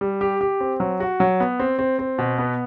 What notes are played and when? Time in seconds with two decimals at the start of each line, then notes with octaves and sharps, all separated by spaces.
0.01 G3
0.21 G4
0.41 G4
0.60 C4
0.80 F#3
1.00 F#4
1.20 F#3
1.40 B3
1.60 C4
1.79 C4
1.99 C4
2.18 B2
2.38 B3